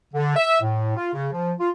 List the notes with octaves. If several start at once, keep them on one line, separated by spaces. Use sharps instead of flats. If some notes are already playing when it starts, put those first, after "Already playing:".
D3
E5
A2
F4
C#3
F3
F4